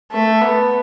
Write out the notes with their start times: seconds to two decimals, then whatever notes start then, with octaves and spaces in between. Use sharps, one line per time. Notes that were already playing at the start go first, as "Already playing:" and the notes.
0.12 A3
0.42 B3